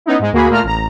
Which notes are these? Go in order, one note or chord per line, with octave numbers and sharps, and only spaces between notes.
B3 C#4 D#4 E4
G#2 G#3
D2 A#3 F#4 G#4 B5
A#2 A3 A#3 F4 A#5 F6
A1 A#5